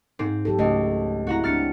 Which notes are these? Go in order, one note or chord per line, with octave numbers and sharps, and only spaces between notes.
G#2 C4
F#3 G4 A4
C#2 A3 C#4 D#5
C4 E4 F#4 F#5 A#5
C4 D4 F6 A6 C#7